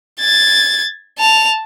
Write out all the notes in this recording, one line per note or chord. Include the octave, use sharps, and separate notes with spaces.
G#6 A6
A5 F7